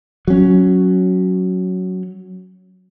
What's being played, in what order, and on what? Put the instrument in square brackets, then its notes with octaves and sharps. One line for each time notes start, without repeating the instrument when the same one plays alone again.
[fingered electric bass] F#3 C#4